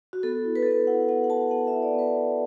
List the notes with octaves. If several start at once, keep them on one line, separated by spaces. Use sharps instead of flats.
F#4
B3 A4
E4
B4
A4
B3 B4
E4 F#5
B3 F#5
F#5
E4 A5
B3 F#5
E4 E5
D5
B3
B4